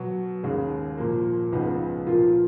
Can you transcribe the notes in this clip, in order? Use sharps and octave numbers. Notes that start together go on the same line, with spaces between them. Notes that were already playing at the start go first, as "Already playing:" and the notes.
Already playing: B2 F#3 B3
D#2 C#3 G#3 C#4
A#2 F3 A#3
C#2 C#3 F3 B3 D#4
A#2 F3 A#3 F4